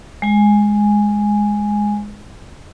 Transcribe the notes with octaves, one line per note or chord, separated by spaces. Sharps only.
G#3 G#5